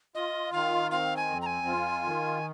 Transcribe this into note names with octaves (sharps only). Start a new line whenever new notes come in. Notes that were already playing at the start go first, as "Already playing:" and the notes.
F4 D#5
D#3 F5
C4 F5
G#5
F2
A#5
G#5
F4
D#3